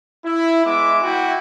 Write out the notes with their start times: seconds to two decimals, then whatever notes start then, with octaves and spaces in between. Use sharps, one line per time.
0.25 E4
0.65 G#3 B3 E5 D6
1.03 E4 F#4 G5